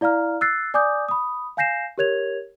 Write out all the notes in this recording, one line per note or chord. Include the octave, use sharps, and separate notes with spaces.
E4 D5 F5 A#5 F6
E6 F#6 A6 C7
D5 G#5 D6 D#6 G6
B5 D#6
F5 G#5 G6 A#6 C7 E7
G4 A#4 C#5 G#6 F7